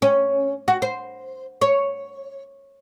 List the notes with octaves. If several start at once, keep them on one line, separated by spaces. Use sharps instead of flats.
C#4
F#4
C5
C#5